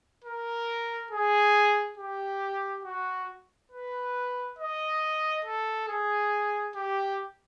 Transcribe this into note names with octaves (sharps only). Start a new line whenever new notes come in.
A#4
G#4
G4
F#4
B4
D#5
A4
G#4
G4